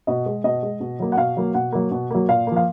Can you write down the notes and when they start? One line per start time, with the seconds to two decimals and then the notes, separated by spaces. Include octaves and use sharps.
0.07 B2 D#5
0.26 G#3
0.44 B2 D#5
0.62 G#3
0.80 B2
1.00 F#3 A#3
1.12 F#5
1.17 B2 F5
1.37 F#3 A#3
1.54 B2 F#5
1.73 F#3 A#3
1.91 B2
2.11 F#3 A#3
2.29 A#2 F5
2.47 F3 A#3
2.56 F5